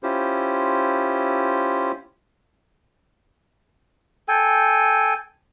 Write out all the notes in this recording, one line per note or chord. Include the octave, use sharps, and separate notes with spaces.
C#4 E4 F4 G4 C5
A4 G5 G#5